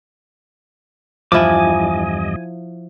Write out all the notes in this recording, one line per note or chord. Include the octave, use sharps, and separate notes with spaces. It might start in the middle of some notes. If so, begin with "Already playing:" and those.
E2 G2 F3 E4 D#5 G#5 D6